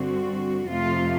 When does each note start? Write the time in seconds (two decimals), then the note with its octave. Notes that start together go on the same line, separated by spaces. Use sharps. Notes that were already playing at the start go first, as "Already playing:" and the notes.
Already playing: G2 D3 G3 C4 F#4
0.70 F2 C3 F3 A3 F4